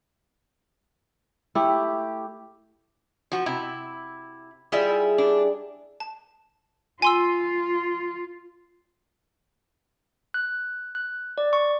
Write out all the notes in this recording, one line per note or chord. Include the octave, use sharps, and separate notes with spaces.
A3 E4 G4
F3 F#4
C3 E4
G3 E4 F4 G#4
D4
A5
F4 G#5 C6 E6
F#6
F#6
D5
C#6